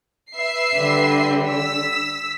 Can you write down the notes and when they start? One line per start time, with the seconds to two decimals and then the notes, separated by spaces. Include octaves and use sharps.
0.36 B4 E5 C7
0.76 D3 G3
1.48 E6 B6